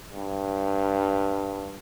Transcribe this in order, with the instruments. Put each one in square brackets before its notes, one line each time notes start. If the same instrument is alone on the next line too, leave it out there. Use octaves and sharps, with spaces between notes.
[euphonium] G2